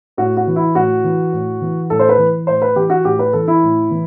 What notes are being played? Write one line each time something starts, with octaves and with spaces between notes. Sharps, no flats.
A2 F#4
F#4
E3
E4
A2 F#4
E3
A2
E3
A2 A4
C5
B4
E3
A2 C5
B4
E3 G4
F#4
A2 G4
B4
E3 A4
E4
A2
E3